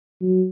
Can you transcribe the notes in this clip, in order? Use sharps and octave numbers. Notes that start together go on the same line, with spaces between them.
F#3